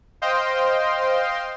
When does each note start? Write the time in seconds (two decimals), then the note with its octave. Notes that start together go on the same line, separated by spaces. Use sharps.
0.22 C5 D#5 F5 G5 C6